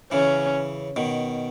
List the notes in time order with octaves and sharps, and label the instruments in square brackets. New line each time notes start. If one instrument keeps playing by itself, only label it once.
[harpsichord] C#3 E3 [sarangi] C#4
[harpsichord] B2 D#3